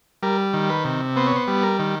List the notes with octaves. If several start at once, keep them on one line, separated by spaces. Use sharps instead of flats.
G3 A#4
D#3
B4
C3
B3 C5
C#5
C5
G3
A#4
D#3